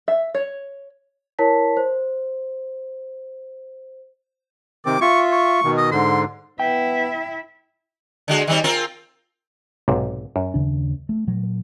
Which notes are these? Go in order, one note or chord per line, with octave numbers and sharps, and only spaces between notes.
E5
C#5
E4 A#4 C#5 A5 B6
C5
C3 D#3 C4 D6
F4 E5 C#6
C#6
B2 D#3
D#5
G#2 D3 C6
B3 E4 E5 G5
D3 G#3 F#4
D#3 G3 C4
C4 F4 A#4
B1 G#2 C3
F#2
D#2 C#3 D4
A3
A#2 F#3